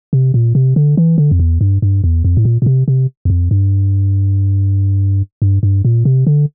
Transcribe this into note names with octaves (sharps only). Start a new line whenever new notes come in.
C3
A#2
C3
D3
E3
D3
F2
E2
G2
G2
E2
F2
A2
A#2
A#2
C3
C3
E2
F2
G2
G2
G2
A#2
C3
D3